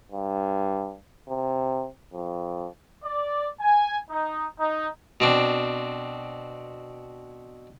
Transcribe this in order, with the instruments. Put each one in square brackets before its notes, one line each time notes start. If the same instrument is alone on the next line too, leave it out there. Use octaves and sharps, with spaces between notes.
[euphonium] G2
C3
F2
[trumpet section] D5
G#5
D#4
D#4
[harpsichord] B2 C4 D4